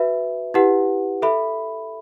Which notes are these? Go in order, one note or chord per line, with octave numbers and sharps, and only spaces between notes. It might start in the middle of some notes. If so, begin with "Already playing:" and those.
Already playing: F#4 B4 E5
E4 G4 B4 F#5
A4 E5 B5